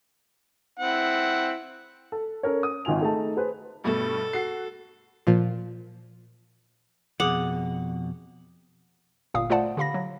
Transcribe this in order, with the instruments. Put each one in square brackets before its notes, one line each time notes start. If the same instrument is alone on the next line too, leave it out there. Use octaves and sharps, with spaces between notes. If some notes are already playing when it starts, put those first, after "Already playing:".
[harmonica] C4 E4 F#5
[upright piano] A4
C#4 A4 A#4 C#5
D#6
G#1 D#3 F4 G#5 F7
A3 D#4 G#4 A4 A5
G#4 B4 C5
[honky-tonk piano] G2 B2 A3 [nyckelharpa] A4
[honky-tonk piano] F#4 C7
[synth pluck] A#2 F3
[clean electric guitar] F2 B2 [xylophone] G#4 D6 D#6 [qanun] F#5
[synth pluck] G1 A#2 F5 D#6
A3 F4 C5 D5 F#5 A5
D3 G4 F5 B5 A#6
F#3